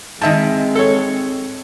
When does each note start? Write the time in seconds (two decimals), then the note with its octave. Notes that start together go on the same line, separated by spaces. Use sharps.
0.21 G#2 D#3 G#3 C4 D#5 E5 A5
0.75 A4 C#5